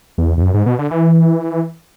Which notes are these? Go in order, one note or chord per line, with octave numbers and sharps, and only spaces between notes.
E2
E2
F#2
G#2
B2
D3
E3